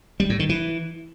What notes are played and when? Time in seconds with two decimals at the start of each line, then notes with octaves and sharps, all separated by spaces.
0.20 G3
0.30 A2
0.39 D#3
0.49 E3